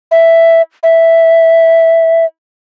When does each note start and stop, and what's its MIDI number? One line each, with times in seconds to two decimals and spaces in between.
0.11 0.62 76
0.83 2.25 76